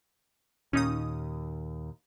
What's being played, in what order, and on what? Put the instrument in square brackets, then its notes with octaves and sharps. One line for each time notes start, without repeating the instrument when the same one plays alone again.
[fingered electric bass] D#2 [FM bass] A#2 [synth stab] C#4 D#4 D#6